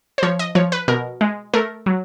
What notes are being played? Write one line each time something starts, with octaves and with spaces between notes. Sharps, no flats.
C5
F3 C#5
D#5
F3 C#5
B4
B2 A#4
G#3
A3 A#4
F#3